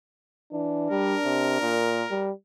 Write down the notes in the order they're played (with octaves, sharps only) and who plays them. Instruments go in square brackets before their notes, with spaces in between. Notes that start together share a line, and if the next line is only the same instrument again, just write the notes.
[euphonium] E3 [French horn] D4
[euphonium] G3 [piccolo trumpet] A#4
[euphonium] C3
A#2
G3